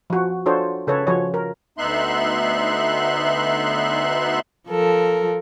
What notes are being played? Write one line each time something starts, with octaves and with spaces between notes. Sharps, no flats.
F3 F#4
D4 F4 F#4 A4 C5 C#5
C#3 A4 B4 C#5
F3 F#4 C#5
A#4
D2 B3 D#4 E5 C6 F#6
F3 A4 A#4